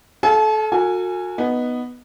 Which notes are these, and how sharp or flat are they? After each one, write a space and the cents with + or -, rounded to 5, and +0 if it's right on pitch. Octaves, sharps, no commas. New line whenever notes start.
A4 -30 F5 +0 G#5 +30
F#4 -35 A4 +45 G#5 +0
B3 +0 D#4 +0